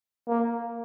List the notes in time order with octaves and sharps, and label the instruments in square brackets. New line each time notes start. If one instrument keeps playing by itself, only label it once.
[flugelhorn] A#3